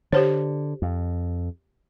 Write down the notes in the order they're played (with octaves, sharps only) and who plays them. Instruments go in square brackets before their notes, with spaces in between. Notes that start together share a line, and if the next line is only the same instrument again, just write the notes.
[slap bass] D3 [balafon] G4 C5 C#5
[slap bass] F2